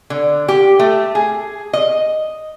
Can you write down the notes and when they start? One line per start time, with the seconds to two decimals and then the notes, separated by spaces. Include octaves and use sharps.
0.10 D3
0.48 G4
0.79 A3
1.15 G#4
1.73 D#5